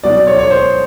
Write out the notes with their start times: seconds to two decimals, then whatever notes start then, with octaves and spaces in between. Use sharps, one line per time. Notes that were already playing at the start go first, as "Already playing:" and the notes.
0.04 B2 F#3 D5
0.27 C#5
0.39 C#5
0.50 C5